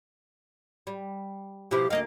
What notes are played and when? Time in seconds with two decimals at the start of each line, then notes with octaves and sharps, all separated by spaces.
0.87 G3
1.71 B2 F3 E4 G4
1.90 D2 A#3 D#5 F5